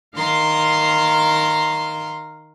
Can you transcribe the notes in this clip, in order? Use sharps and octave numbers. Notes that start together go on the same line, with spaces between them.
D#3 F5 A#5 C6